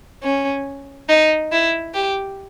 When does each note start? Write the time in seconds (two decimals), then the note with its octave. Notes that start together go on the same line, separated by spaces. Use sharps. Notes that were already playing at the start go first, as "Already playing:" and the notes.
0.23 C#4
1.09 D#4
1.52 E4
1.94 G4